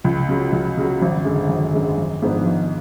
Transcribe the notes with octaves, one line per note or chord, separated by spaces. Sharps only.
C#2
C#3 F#3
C#2
C#3 F#3
G#1
F#2 D3 G#3
G#1
F#2 D3 G#3
G#1
G#2 F3 B3 D4
G#1